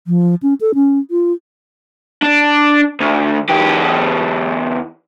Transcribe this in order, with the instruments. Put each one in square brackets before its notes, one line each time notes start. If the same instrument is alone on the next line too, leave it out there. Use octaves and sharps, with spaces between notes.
[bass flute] F3
C#4
A4
C#4
F4
[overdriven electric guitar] D4
D2
E2 G4